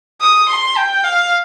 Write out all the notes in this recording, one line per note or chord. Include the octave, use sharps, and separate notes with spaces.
D#6
C6
G5
F5